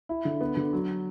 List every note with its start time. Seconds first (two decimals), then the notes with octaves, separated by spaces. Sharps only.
0.09 E4
0.25 D3
0.41 B3
0.57 D3
0.73 F#3